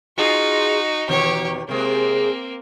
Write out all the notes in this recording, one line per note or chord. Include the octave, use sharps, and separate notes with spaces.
D#4 F4 F#4 G#4
E2 B2 D#3 G4 C#5
C3 G#3 A#3 C4